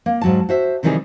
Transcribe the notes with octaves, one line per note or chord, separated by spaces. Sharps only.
A#3
G#2 F#3 A5
F#4 C5 E5
C3 D#3 E3 G3 D#4 G#4